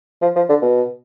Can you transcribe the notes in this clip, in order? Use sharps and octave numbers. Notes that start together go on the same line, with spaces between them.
F3
F3
D3
B2